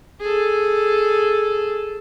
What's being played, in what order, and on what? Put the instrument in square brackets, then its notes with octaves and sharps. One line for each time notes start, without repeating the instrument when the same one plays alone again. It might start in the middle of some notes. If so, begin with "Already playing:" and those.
[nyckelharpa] G#4 A4